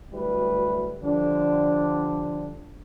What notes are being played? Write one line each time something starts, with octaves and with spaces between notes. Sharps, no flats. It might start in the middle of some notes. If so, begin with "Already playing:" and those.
D2 F#3 G3 E4 B4
D3 F3 G3 D4